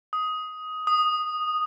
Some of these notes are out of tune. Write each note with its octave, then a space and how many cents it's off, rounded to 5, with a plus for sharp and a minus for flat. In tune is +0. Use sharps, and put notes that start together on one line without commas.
D#6 +10
D#6 -10